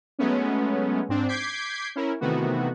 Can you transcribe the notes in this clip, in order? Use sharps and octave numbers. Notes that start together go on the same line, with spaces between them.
F#3 G#3 A3 B3 C#4
G#2 C4 D4
D6 G6 G#6 B6 C7 D7
C#4 E4 A#4
C3 D#3 E3 A3 B3 F#4